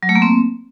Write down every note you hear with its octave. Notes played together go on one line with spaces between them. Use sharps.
F#3
A3
A#3
C4